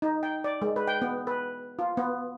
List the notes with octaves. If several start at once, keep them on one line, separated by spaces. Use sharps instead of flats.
D#4
G5
D5
G#3
B4
G5
B3
B4
F4
B3